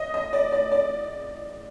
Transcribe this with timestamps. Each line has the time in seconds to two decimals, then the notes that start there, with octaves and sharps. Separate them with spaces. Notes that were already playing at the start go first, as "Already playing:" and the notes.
Already playing: D#5
0.14 D#5
0.33 D5
0.52 D5
0.72 D5